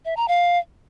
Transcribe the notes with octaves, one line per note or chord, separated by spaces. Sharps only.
E5
A#5
F5